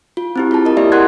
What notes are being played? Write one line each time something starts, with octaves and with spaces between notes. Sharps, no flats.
F4
C4 E4 G4
F4 G#4 A5
A#4 D#5 A5
A#3 E4 G4 D5 E5
A#4 F#5 C6 F#6 G#6